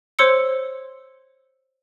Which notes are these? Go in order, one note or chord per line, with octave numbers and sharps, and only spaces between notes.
C5 C#5 C6 E6 C#7